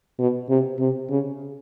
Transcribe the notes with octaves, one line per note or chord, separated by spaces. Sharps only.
B2
C3
C3
C#3